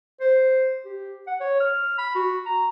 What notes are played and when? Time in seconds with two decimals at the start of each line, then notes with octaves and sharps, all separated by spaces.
0.20 C5
0.85 G4
1.27 F#5
1.40 C#5
1.60 F6
1.98 B5
2.15 F#4
2.46 A#5